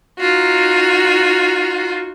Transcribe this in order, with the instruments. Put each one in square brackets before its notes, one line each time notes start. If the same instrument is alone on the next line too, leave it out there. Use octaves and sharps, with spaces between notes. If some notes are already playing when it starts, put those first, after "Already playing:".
[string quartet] D#4 F4 F#4